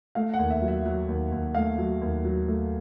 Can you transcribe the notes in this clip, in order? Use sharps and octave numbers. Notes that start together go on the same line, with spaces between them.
A3 F5
F#5
D#2
E5
F#3
E5
F#3
D#2
D#2
A3 F5
F#3
D#2
F#3
A3